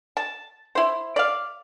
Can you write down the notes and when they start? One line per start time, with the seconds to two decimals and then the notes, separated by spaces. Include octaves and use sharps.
0.17 A5
0.75 E4 C5
1.16 D5 F5